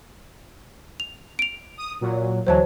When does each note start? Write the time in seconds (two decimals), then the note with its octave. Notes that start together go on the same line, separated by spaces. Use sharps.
1.00 F7
1.39 D7 F7
1.77 D#6
2.01 A#2 F#3
2.47 D2 E3 F#3 C5 C#5 A5